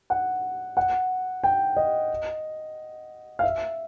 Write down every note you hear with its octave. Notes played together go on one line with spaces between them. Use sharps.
F#5
F#5
G5
D#5
F5
E5